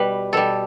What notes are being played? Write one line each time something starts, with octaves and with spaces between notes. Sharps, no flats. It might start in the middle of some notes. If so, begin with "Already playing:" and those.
Already playing: B2 G3 B4
B2 G3 A4